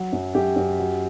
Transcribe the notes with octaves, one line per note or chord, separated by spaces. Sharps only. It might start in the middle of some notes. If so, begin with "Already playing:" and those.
Already playing: F#3 F#4
F#2
F#2 G4
F#2
F#3